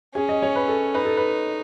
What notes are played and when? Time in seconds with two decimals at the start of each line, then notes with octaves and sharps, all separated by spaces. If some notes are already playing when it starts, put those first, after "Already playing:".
0.15 C#4 G#4
0.29 D#5
0.42 C#5
0.56 B4
0.68 A4
0.95 D#4 B4
1.05 A4
1.17 B4